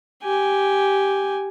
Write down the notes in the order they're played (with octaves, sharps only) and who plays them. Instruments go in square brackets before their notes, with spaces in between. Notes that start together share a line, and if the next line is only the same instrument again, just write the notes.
[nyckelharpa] G4 G#5